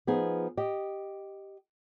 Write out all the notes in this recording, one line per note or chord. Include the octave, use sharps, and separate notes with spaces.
F3 B3 D#4 G#4
G4 D#5